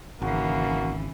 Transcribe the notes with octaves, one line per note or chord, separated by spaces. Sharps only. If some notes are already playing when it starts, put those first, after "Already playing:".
G#1 C#3 E3 A#3 F#4